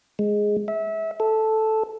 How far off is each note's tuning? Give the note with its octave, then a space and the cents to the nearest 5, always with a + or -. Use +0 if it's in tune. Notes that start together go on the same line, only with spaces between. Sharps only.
G#3 +0
E5 -25
A4 -5